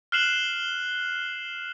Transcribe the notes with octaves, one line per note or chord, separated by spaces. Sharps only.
F6 F#6 C7 E7 F#7